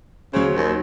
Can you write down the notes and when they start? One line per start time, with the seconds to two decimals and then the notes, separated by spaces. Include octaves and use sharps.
0.33 C#3 F#3 C5
0.56 D#2